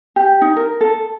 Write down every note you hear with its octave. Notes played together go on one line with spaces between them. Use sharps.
G4
D#4
A#4
A4